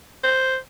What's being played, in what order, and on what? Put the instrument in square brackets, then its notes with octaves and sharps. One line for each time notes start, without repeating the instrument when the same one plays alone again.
[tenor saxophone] C5